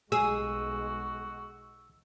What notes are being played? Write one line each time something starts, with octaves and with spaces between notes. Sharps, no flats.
B1 G#3 F#4 G#4 E6